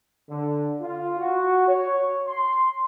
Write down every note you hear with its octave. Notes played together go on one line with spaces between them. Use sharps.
D3
F4
F#4
C#5
C6